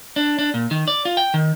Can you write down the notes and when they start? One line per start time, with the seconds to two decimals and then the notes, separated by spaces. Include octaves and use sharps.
0.16 D4
0.39 D4
0.54 A#2
0.71 D#3
0.88 D5
1.05 F4
1.17 G5
1.34 D#3